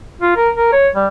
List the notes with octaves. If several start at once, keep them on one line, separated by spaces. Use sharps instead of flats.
F4
A#4
A#4
C#5
G3